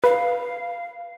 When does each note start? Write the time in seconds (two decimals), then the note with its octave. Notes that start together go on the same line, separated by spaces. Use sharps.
0.04 B4 F5